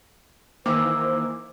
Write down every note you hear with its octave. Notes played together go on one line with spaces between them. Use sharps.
D#3 E3 A#3 C5 D6 E6